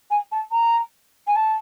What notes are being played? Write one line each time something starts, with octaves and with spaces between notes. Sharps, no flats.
G#5
A5
A#5
G#5
A5